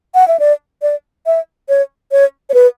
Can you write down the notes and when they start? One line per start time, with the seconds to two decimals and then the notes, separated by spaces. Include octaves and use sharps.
0.15 F#5
0.28 E5
0.39 D5
0.82 D5
1.26 E5
1.69 C#5
2.12 C#5
2.50 C#5
2.54 B4